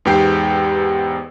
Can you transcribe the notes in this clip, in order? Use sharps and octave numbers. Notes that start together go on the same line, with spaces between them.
E2 G#2 B3 G4 G5 C7